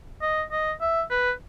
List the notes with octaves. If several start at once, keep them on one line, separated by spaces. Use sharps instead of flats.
D#5
D#5
E5
B4